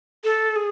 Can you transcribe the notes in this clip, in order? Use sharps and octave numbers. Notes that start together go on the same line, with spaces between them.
A4
G#4